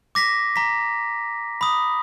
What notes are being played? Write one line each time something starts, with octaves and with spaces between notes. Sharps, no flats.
D6 A#6 B6
A#5 B6
B5 D#6